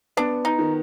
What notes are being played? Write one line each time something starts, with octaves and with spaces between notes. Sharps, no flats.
B3 D4
D#4
D#3